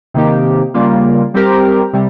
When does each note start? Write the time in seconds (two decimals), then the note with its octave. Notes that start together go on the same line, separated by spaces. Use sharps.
0.14 C3 D#3 A#3 D#4 G4
0.74 C#3 G3 A#3 F4
1.34 G3 C4 G4 A#4
1.93 C3 G3